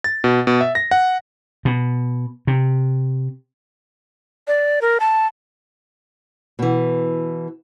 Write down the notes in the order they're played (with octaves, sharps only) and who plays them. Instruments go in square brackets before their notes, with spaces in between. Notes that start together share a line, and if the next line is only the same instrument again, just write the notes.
[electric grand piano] A6
B2
B2
E5
A#6
F#5
[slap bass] B2
C3
[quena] D5
A#4
A5
[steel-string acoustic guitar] B2 E3